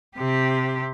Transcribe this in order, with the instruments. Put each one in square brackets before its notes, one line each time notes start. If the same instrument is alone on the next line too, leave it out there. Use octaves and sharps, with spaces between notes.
[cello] C3 G4